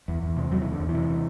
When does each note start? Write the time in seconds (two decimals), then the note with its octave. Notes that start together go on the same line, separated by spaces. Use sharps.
0.08 E2
0.23 E2
0.36 C3
0.51 E2 F#3
0.61 E3
0.65 E2
0.70 D3
0.80 E2
0.89 C3 E3
1.09 C3